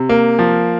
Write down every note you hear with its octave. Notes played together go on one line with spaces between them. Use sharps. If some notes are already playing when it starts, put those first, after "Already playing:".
Already playing: C3
A#3
F3